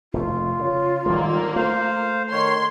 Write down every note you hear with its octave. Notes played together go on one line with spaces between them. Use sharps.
F1 A3 F4
C#3
D#2 D3 D#3 G3 G#3 A#3
A3 C5 F5
D#3 C#5 C6